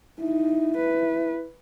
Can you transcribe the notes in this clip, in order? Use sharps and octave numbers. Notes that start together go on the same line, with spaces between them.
D#4 E4
B4